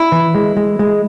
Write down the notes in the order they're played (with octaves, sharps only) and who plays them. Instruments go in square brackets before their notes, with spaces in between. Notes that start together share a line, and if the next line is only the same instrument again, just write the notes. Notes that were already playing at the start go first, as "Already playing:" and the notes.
Already playing: [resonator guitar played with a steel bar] E4
[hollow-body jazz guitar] E3
G#3
G#3
G#3